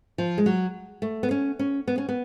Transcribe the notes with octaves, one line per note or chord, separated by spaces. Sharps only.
F3
G#3
F#3
A3
B3
C#4
C#4
B3
C#4
B3